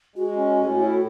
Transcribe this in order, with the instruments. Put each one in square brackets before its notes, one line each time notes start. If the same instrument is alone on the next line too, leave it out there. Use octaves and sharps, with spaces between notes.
[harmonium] G#3 [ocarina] F#4
[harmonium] C#4
A2
E4